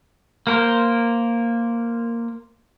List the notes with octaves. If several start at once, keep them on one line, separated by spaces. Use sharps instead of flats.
A#3 A#4 C5